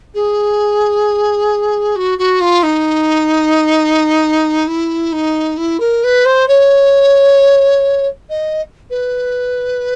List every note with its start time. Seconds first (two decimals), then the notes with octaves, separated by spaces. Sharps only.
0.14 G#4
1.96 F#4
2.18 F#4
2.40 F4
2.63 D#4
4.67 E4
5.12 D#4
5.57 E4
5.80 A#4
6.03 B4
6.25 C5
6.48 C#5
8.29 D#5
8.90 B4